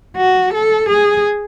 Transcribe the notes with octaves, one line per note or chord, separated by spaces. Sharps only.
F#4
A4
G#4